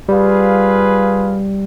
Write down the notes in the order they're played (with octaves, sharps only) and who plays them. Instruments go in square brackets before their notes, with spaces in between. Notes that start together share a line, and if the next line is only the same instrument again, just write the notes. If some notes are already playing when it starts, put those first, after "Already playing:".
[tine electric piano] G3 [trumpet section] F4 G#4 B4 F5